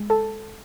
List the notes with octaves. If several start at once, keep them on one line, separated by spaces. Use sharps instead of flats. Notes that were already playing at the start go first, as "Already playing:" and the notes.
Already playing: G#3
A4 A5